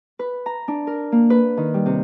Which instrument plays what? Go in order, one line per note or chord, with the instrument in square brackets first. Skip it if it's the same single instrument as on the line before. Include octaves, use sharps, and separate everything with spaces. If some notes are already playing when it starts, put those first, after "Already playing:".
[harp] B4
A#5
D4
A#4
A#3
B4
D#3
G3
C3